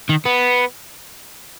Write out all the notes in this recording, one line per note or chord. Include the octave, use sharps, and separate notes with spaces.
D#3
B3